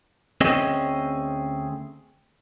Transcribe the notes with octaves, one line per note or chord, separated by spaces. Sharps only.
D2 C4 C#4 G#4 D#5